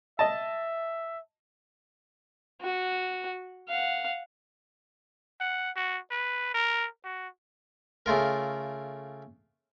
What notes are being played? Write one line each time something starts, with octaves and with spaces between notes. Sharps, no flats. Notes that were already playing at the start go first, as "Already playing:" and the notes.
D#5 E5 A5
F#4
F5 F#5
F#5
F#4
B4
A#4
F#4
C#3 A3 F4 A#4